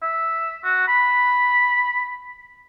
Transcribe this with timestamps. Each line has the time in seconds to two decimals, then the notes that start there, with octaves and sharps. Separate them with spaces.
0.02 E5
0.64 F#4
0.88 B5